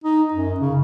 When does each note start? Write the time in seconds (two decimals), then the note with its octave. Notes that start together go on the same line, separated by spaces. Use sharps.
0.04 D#4
0.33 F#2
0.60 C#3